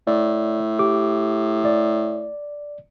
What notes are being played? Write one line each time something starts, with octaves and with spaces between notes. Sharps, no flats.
A2 D5
G4 D6
D5